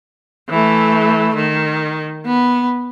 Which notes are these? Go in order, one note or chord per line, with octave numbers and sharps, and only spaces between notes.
E3 A3
D#3
B3